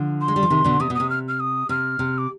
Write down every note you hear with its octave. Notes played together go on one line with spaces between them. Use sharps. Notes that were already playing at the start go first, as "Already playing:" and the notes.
Already playing: D3 F3
C6
G#3
G3
F3
C3 D#3
B2 D3
C3 D#6
B2
D#6
C3
F6
F6
D#6
C3 F6
C3
D6